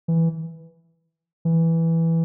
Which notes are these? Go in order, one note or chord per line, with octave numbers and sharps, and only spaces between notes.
E3
E3